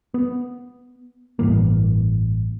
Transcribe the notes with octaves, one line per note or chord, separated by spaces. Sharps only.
B3
A1 G2 E3 A#3